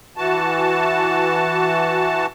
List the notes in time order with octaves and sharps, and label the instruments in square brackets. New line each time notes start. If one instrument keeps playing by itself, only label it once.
[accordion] E3 F#4 A5